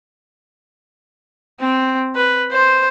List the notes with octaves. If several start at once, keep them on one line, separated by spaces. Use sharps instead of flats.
C4
B4
C5